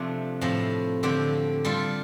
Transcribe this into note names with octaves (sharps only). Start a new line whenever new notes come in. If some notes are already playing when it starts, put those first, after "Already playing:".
Already playing: C3 F3 A3 D4
A2 F3 C4
D3 F3 C4 G4
G3 F4 A4